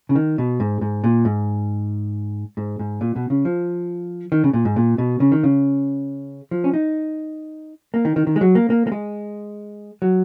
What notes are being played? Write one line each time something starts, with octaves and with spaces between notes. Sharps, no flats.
C#3
D#3
B2
G#2
G#2
A#2
G#2
G#2
G#2
A#2
B2
C#3
F3
D#3
C#3
A#2
G#2
A#2
B2
C#3
D#3
C#3
F3
C#4
D#4
A#3
D#3
D#3
D#3
G#3
F#3
A#3
A#3
A#3
G#3
F#3